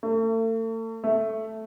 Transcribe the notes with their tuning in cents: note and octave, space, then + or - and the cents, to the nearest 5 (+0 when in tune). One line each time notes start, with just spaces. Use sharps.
A3 +40
A3 +0